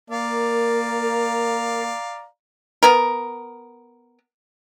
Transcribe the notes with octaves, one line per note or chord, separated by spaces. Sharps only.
A#3 A#4 D5 F5 A#5
B3 A#4